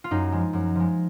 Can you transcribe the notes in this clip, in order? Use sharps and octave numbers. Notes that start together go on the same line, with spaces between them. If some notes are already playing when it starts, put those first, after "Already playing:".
F4
F#2 D#4
F3 G#3
F#2
F3 G#3